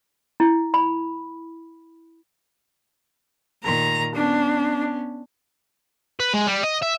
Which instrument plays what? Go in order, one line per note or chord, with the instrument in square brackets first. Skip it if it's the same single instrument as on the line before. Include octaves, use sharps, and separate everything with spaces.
[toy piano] E4
B5
[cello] A#2 D#3 [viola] A#5
[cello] B3 C#4 [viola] D4
[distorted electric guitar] B4
G#3
G3
D#5
E5